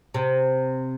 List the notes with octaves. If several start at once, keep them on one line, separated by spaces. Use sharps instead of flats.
C3